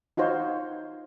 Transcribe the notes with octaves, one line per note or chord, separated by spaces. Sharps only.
D#4 F4 F#4 C5 C#5